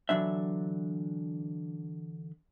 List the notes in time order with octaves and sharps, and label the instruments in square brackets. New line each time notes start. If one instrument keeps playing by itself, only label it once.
[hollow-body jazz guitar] D3 E3 F#3 D4 E5